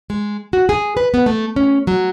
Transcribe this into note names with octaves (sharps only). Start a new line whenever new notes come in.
G#3
F#4
G#4
B4
B3
A3
C#4
F#3